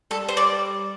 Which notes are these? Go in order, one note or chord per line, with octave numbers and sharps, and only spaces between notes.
G3 A4
C5
D5